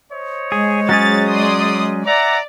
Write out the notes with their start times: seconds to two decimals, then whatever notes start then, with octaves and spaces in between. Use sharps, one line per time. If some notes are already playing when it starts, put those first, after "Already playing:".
0.11 C5 C#5 D#5
0.52 G#3 G#4
0.89 F#3 C#4 G#4 A6
1.28 D5 C6 D#6
2.06 D5 E5 F#5 A#5